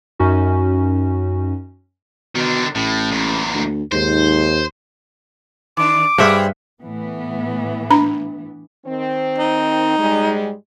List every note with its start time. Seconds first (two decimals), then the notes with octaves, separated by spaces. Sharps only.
0.19 F#2 C#4 D#4 F#4
2.35 B2 D3 D#3
2.75 A1 A2
3.11 E2 A#2
3.54 D2
3.92 D#2 G#2 C5
5.77 D#3 D4 D6
6.18 G2 G3 G#4 C5 E5 F#5
6.79 A2 E3 B3
7.90 D4 A#5 B5
8.86 D#3 C4
9.39 D#4
9.98 G#2 G3 G#3